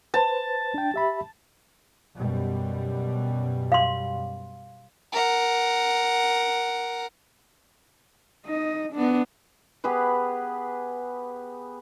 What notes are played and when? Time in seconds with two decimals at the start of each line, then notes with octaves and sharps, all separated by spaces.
0.14 B4 C5 A5
0.74 D4 G5
0.94 G4 E5 B5
2.16 F#2 B2 G3
3.72 F5 C6
5.13 A#4 F#5
8.46 D#4 D#5
8.93 B3 D4
9.84 B3 G4 G#4 B4